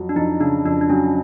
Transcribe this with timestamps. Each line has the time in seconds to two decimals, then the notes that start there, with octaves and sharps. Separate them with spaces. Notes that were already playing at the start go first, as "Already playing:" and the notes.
Already playing: F2 F#3
0.09 D4
0.16 F2 D#4
0.40 C#3 D4
0.65 F2 D4
0.81 D4
0.90 F#3 C#4